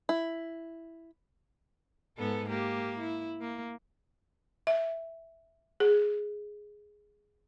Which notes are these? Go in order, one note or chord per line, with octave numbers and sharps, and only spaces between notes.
E4
G#2 B3 A4
A#3 G4
E4
A#3
E5
G#4